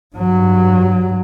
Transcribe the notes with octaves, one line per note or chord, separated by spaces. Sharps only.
G2 F#3